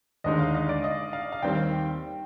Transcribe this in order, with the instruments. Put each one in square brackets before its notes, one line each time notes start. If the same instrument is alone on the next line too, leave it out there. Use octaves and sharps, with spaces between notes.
[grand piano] D#2 D3 G#3 D#4 [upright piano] D#5
[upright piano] F5
D#5
D5
D#5
F5
F5
[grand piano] D#2 D#3 G3 C4 [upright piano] G5